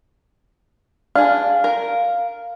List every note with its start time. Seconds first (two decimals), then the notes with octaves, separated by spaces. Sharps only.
1.15 D4 G#4 F5
1.64 A#4